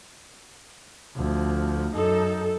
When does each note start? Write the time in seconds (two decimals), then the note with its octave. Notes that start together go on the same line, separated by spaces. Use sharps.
1.15 D2 F3
1.94 F#2 D#4 A4